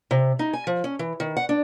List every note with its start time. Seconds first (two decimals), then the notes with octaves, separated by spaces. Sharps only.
0.11 C3
0.39 D#4
0.53 G#5
0.67 F3
0.84 C#4
0.99 E3
1.20 D#3
1.37 F#5
1.49 D4